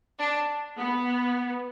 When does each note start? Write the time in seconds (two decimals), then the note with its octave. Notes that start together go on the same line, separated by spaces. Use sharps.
0.19 D4
0.79 B3